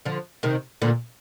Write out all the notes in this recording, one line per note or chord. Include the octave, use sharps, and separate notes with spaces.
D3 F3
C3 D#3
A#2 D3